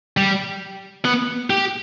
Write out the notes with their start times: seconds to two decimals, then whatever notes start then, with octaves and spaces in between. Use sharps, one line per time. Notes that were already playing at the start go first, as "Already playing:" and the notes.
0.17 G3
1.05 B3
1.50 G4